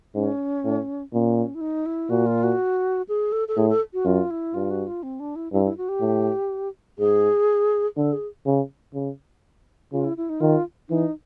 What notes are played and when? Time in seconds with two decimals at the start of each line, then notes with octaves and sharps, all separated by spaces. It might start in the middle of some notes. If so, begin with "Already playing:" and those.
0.15 G#2 C#4
0.64 A2
1.12 A#2 C#4
1.55 E4
1.61 D#4
1.86 E4
2.10 A#2 F#4
2.26 F4
2.43 F#4
3.09 G#4
3.32 A4
3.48 A4
3.57 A2 G#4
3.70 A4
3.93 F#4
4.05 F#2 F4
4.31 E4
4.54 G2 F4
4.71 F#4
4.87 F4
5.03 C4
5.20 D4
5.36 E4
5.53 G2 E4
5.65 E4
5.78 F#4
5.89 G4
6.01 A2
6.99 G#2 G#4
7.97 D3 A4
8.13 G#4
8.46 C#3
8.95 C#3
9.93 C#3 F4
10.04 E4
10.17 E4
10.29 D#4
10.41 D#3 F4
10.89 E3 D#4